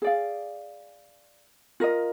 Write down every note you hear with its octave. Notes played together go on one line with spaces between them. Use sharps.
G#4 D5 F5
F4 A#4 D#5